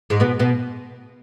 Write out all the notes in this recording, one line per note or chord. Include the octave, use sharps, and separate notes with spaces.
G#2 G#3
B2 B3
B2 B3